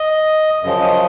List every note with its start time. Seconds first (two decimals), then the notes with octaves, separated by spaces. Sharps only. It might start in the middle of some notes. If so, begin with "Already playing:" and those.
Already playing: D#5
0.63 F#2 C#3 F3 D#5
0.81 D#5